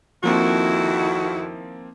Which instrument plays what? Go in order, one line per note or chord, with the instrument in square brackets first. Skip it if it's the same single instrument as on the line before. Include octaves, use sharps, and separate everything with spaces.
[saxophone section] F2 F#4 [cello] D#3 E4 [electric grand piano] F3 A#3 C4